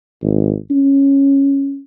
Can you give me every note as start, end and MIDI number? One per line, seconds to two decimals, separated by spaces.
0.23 0.55 32
0.71 1.81 61